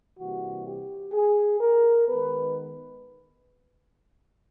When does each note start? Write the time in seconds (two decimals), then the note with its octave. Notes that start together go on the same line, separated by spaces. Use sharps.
0.19 C3 E3 G3 A#3 F#4
0.66 G4
1.13 G#4
1.60 A#4
2.08 D#3 G#3 B3 B4